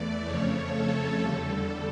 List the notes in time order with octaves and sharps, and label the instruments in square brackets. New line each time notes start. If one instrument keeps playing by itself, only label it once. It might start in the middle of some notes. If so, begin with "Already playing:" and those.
Already playing: [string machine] E2 E3 A3 D5
F2 C#3 F3 A3 C#5
A4
E2 D3 G3